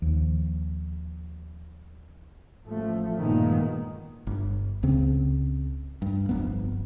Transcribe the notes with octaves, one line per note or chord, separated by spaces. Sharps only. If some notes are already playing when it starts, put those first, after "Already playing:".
D#2 F3
A1 F3 A3
G2 A#2 D#3 G#3 A#3 B3
G1
C#2 C#3 C4
G2
D1 G1 F2 B3